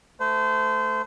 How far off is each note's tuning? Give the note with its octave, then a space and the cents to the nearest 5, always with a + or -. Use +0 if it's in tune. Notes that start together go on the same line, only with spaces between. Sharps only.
A3 +0 C5 -30